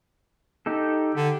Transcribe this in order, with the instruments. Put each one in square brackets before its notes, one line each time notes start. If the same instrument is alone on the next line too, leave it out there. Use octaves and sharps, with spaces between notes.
[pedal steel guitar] D#4 G4 A4
[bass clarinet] D3 [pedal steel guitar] G4